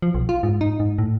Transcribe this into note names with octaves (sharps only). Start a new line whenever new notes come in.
F3
B1
F4
G#2
D#4
G#2
A2